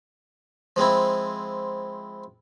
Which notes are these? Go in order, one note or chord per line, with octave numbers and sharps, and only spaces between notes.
F3 G#3 C4 E4